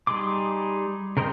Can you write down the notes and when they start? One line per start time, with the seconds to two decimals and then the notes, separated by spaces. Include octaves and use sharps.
0.07 G3 D#4 G#4 C6 D6
1.17 C#3 A#4 C5 D#5 G5